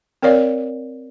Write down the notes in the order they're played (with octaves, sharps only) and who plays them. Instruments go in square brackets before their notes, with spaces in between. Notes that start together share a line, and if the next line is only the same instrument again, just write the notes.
[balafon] C4 A#4 C#5 D5 F5